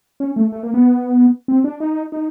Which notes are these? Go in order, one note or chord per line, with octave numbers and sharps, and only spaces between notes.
C#4
A3
A3
A#3
B3
C4
D4
D#4
D#4